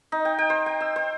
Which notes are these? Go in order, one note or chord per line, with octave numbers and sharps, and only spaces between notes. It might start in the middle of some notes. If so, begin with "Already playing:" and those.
D#4
G5
G5
C5
G5
E6
C5